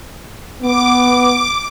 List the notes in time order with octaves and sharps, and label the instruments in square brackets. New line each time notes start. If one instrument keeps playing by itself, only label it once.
[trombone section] B3 [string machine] D6